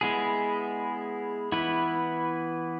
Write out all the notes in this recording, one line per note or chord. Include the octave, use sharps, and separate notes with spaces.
G#3 B3 E4 G#4
E3 B3 E4 B4